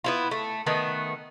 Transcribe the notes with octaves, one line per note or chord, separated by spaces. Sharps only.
B3 E4 F4
A3
D#3 A3 B3